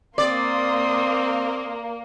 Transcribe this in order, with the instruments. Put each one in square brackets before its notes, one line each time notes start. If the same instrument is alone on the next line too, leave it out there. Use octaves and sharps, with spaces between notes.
[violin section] A#3 [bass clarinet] C4 [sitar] D5 [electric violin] C6 D#6